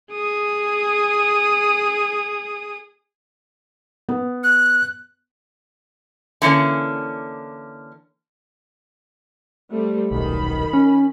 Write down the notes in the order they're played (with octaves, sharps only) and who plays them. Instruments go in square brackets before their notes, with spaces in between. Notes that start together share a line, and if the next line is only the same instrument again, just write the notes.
[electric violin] G#4 D#6
[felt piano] B3
[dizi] F#6
[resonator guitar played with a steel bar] D3 E3 A#3 C#4
[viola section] G3 A3 C4
[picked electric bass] D#1 B1 [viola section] D#3 B5
[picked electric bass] C#4